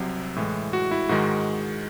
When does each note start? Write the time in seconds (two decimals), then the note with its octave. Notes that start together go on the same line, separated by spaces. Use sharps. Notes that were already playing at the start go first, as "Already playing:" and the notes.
Already playing: C2 C3 F#3
0.36 A2 E3 G#3
0.73 F#4
0.91 E4
1.09 G#2 D#3 G#3 F#4